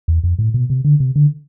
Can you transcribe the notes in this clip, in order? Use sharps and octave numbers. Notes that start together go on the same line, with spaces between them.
E2
F2
A2
B2
C3
D3
C3
D3